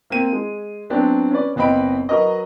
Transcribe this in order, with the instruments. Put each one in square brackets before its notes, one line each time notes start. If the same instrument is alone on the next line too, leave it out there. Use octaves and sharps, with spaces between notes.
[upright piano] A#3 C4 D#7
G#3
F#3 B3 C4 D4
C#4 B4 D5
F#1 B3 C4 D#5 B5 D7
F#3 F#4 A#4 B4 D#5